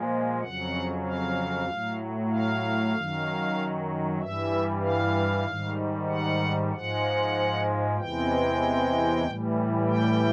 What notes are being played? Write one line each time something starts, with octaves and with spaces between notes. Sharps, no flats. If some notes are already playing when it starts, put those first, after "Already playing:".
Already playing: A#2 F3 G#3
F2 C#3 F#3 F#5
F5
A2 F#3
F5
F#2 D#3 F#3
G2 E3 G3 E5
F5
G#2 D#3 G3
F#5
G#2 F3 G#3 F#5
E2 C3 E3 G#3 G5
A2 E3 G3
G5